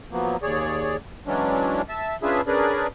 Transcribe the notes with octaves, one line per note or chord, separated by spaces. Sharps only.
F3 F#3 A#3 B3
D#2 G#4 C#5 D5
E3 F#3 G#3 C#4 D4
E5 A5
C#4 D4 F4 G#4 B4 E5
C#4 D4 G#4 A#4 B4 D5